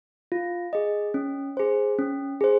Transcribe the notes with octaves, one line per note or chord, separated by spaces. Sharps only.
F4
G#4 D#5
C#4
G#4 C5
C#4
G#4 C5